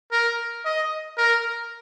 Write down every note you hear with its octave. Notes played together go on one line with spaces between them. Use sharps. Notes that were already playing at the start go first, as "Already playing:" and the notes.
A#4
D#5
A#4